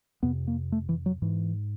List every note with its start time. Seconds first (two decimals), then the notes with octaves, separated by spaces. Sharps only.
0.23 F2 C3 B3
0.47 A#3
0.72 A3
0.89 E3
1.06 F#3
1.22 G#2 E3